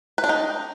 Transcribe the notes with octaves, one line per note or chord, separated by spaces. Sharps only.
B4
D4
D#4